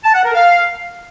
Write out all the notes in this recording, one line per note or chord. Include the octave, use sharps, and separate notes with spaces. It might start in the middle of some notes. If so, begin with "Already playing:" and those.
A5
F#5
A#4
F5